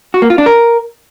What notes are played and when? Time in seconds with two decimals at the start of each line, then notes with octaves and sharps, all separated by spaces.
0.14 F#4
0.22 A#3
0.30 F4
0.38 D4
0.46 A#4